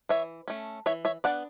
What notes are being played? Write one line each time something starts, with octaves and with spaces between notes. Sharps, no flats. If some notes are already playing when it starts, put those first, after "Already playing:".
E3 C#5 E5
A3 C#4
E3 C#5 E5
C#5 E5
B3 D4 D5 F#5